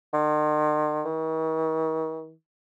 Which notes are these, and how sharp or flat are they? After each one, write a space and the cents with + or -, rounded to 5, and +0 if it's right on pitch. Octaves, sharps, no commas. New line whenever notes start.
D#3 -45
D#3 +45